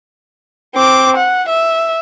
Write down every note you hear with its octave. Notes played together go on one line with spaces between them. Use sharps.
C4 D6
F#5
E5